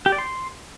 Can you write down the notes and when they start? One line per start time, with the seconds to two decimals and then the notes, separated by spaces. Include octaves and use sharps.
0.06 G4
0.12 D5
0.19 C6